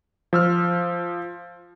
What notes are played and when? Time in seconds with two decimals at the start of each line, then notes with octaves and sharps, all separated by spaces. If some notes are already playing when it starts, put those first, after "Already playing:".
0.33 F3 E6 F6